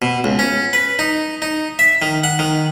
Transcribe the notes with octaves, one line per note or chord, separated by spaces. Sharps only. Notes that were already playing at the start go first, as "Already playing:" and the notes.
B2
C#2
C#4
B4
D#4
D#4
E5
D#3
F#5
D#3